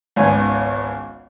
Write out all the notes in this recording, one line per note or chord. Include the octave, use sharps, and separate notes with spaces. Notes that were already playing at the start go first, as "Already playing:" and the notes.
G#1 C#2 B3 G#5